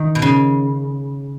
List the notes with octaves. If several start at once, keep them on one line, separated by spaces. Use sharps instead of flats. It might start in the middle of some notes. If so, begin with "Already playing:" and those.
Already playing: D#3
B2
C#3